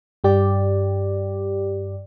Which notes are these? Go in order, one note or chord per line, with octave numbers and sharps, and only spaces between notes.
G2 G4 D5